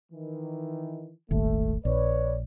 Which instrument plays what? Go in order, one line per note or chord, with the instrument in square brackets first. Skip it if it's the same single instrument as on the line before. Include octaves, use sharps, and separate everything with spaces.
[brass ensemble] D#3 E3
[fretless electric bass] D#1 G#1 D#2 [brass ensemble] A3
[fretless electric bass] A#1 [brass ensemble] B4 C#5 D5